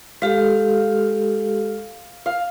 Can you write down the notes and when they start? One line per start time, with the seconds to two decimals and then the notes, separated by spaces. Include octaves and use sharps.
0.22 G#3 G4 A4 F5
2.26 F5